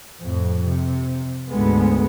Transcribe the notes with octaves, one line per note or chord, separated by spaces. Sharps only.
F2 A2
C3
D2 G#2 D3 G#3 B3